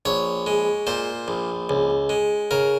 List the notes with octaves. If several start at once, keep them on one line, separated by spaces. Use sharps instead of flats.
A#1 C#5
G#3
A#2 C5
A#1
C#2
G#3
C#3 A#4